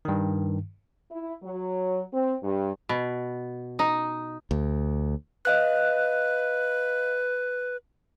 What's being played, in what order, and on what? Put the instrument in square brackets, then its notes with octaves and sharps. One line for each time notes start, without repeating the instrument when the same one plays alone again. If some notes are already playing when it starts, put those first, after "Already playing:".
[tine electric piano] G2 D#3
[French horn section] E4
F#3
C4
G2
[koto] B2
D#4
[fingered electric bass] D2
[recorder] B4 [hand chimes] D#5 F5 F#6